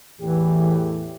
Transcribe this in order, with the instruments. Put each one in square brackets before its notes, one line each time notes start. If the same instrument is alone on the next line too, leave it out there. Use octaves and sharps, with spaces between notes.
[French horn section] E2 A2 G4 [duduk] E3